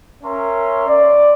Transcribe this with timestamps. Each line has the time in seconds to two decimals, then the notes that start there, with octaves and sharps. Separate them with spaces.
0.24 C#4 A#4 C#5 E5 A#5 C6
0.88 D5